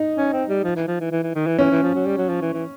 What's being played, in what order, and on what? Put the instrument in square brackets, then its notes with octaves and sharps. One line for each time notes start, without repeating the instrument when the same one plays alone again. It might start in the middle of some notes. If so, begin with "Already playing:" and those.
Already playing: [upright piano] D#4
[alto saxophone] C#4
C4
G3
F3
E3
F3
E3
E3
E3
D#3
E3
[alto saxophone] E3 [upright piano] C#4
[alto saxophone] E3
F3
F#3
G3
F#3
F3
E3
E3